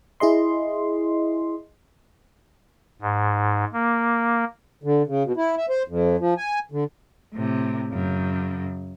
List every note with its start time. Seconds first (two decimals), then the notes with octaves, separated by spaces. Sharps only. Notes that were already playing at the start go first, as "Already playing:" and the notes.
0.20 E4 G#4 D#5 C6
3.01 G#2
3.73 A#3
4.84 D3
5.07 C#3
5.24 B2
5.37 E4
5.58 E5
5.69 C5
5.88 F2
6.19 F3
6.38 G#5
6.72 D3
7.34 A2 C3
7.89 F#2 C#3